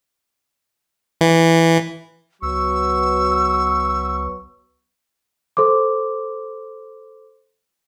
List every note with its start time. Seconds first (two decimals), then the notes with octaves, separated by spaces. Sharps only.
1.21 E3
2.43 C#2 F#3 B3 C#6 E6
5.57 A4 C5 C6 D6